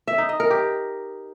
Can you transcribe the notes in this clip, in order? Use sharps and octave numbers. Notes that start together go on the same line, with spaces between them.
E5
D#4
D#5
A#4
G4